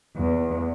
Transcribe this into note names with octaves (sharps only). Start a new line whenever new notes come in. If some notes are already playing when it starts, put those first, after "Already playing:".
E2